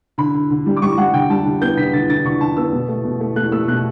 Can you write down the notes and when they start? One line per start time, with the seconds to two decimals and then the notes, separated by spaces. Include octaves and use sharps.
0.18 D3 B5
0.34 D3
0.50 D3
0.66 G3
0.77 D6
0.82 G3 C#6
0.98 G3 F#5
1.14 D3 G5
1.30 G3 A5
1.46 D3
1.61 B3 G6
1.77 D3 B6
1.93 D3 A6
2.09 D3 A6
2.25 D3 C#6
2.41 D3 A5
2.57 B3 E6
2.73 B2
2.89 A3
3.05 B2
3.21 A3
3.36 A3 F#6
3.52 A3 E6
3.68 B2 F#6